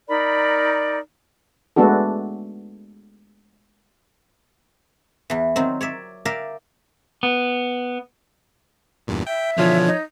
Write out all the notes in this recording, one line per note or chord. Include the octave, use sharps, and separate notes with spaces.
D#4 A#4 D5 B5
G#3 A3 B3 D4 F#4 A4
E2 E3
D#3 F#3 C4
C#5 D5 E5
A#4 D5 E5 F5 G5 A#5
B3
E2 G2 A#2
E5 G5
B2 D3 E3 F3 C#5
D#4